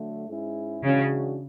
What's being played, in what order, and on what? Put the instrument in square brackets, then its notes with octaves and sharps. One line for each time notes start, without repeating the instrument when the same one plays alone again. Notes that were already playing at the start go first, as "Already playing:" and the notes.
Already playing: [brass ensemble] D3 F#3 A3
G#2 G#3 C#4 E4
[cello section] C#3 [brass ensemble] E3 G#3 D4 F#4